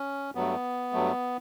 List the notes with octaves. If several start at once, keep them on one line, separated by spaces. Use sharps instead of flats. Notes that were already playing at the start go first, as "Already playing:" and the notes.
Already playing: C#4
G2 F#3 A3 B3
G2 F#3 A3